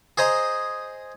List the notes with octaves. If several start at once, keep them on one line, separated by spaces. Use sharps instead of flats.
G#4 C5 D#5 A#5